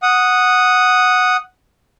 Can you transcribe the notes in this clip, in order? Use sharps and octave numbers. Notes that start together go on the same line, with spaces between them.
F#5 D#6